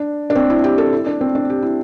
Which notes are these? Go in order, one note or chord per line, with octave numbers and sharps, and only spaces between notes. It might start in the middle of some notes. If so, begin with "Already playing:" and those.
Already playing: D4
D4
C4
E4
G4
A4
E4
D4
C4
D4
G4
E4